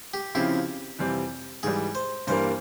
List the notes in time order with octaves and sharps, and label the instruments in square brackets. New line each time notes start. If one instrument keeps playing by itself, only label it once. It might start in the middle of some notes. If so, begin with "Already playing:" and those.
[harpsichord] G4
[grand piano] C#3 F3 C4 E4 [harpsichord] G4
[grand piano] F2 C3 E3 G3 C4
[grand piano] G#2 E3 G3 [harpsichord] G#4
[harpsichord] C5
[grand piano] G2 E3 G3 A#3 [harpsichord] C5